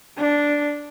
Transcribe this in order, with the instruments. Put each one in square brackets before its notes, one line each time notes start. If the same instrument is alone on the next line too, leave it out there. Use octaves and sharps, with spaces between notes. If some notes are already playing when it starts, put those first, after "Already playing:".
[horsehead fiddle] D4